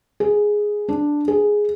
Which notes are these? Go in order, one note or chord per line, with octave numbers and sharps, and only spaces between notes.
G#4
D4
G#4